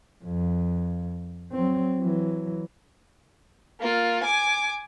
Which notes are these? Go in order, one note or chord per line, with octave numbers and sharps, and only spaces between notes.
F2
F#3 C4
E3 F#3
A#3 F4
G#5 D6